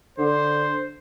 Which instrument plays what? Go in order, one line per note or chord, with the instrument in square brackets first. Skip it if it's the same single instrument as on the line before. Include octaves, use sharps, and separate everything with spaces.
[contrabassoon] D3 [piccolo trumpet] C5